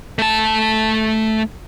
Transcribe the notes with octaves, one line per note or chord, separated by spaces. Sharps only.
A3 A5